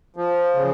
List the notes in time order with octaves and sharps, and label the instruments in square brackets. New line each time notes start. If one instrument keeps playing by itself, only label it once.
[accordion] F3
C#3